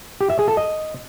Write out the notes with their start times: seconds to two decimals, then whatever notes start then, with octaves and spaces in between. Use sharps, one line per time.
0.21 G4
0.30 E5
0.39 G#4
0.48 A4
0.57 D#5